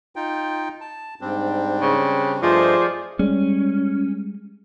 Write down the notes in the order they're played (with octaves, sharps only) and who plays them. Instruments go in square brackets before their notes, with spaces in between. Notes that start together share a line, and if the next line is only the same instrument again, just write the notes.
[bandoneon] D#4 F4 G5
A5
[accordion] G#2 [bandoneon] G3 C4 D4
[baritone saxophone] C#3
[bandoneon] G2 A3 D#5 [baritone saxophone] F3 [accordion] G#4 C5 D5
[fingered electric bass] G3 G#3 [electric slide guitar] C#4